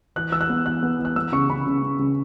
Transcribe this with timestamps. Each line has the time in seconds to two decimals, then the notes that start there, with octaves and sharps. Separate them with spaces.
0.16 E3 F#6
0.32 E3 E6
0.41 F#6
0.49 B3
0.66 E3 F#6
0.83 B3
0.99 E3
1.05 F#6
1.16 B3 E6
1.32 C#3 C#6
1.49 C#3 B5
1.67 C#3
1.83 C#3
1.99 C#3